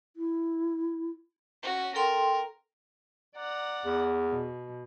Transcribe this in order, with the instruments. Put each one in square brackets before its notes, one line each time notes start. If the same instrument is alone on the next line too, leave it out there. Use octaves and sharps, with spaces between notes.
[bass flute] E4
[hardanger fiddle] C#4 F#4
[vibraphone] A4 G5 C6 [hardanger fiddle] A#4
[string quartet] D5 F#5 A#5
[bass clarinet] E2
[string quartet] B2